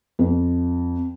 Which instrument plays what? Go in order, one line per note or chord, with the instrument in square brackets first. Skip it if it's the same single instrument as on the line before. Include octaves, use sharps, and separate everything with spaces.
[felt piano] F2